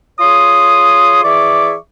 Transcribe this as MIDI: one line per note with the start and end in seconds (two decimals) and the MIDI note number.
0.20 1.22 65
0.20 1.22 68
0.20 1.22 73
0.20 1.22 84
0.20 1.22 87
1.24 1.74 52
1.24 1.74 68
1.24 1.74 74
1.24 1.74 76
1.24 1.74 85
1.24 1.74 86